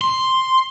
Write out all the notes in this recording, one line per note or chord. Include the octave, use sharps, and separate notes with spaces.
C6